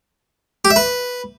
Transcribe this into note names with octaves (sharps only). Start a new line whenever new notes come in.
G4
E5
B4